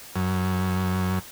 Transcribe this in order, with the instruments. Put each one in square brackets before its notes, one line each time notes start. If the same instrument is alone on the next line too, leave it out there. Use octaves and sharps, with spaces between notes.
[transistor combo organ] F#2